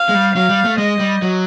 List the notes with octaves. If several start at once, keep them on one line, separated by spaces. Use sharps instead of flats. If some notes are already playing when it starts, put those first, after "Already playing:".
Already playing: F5
G#3
G3
F#3 F5
G3
A3
G#3 D#5
G3
F#3